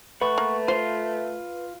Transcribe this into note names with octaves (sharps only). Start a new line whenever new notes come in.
A3 B4 F#5 C#6
A#3
F4 C5 C6